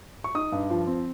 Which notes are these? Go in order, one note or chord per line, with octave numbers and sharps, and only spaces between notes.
C#6
D#4 D#6
G2
F3
C4